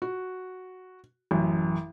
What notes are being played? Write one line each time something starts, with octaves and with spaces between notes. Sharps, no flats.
F#4
A1 F#2